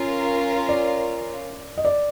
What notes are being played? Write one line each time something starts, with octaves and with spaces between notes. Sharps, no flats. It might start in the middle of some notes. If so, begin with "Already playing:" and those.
Already playing: C#4 F4 A#4
D5
D#5
D5